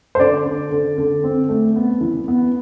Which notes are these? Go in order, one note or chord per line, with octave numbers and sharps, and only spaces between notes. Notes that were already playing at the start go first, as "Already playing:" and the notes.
C5
D3 D5
D3
D3
D3
C4
A3
B3
E3
B3